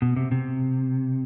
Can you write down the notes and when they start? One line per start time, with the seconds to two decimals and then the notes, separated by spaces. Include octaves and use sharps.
0.02 B2
0.16 C3
0.32 C3